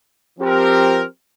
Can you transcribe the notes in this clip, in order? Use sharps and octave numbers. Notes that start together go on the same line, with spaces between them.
F3 C4 G4 A#4